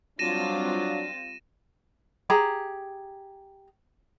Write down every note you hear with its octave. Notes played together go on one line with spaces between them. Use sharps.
F#3 G3 C4 D4 F4 A#6 D#7 E7
G4 G#4 A#5